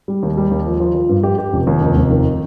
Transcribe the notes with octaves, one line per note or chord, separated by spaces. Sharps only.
G3
D#2
G3
D#2
F3
F3
F3
G2
G4
G4
F1
D#2
F1
F1
D#3